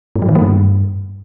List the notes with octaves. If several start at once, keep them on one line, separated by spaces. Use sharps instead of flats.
G#2
F#3
D#3
A#3
G2